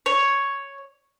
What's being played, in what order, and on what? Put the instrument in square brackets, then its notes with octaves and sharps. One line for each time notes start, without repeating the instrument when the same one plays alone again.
[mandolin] C#5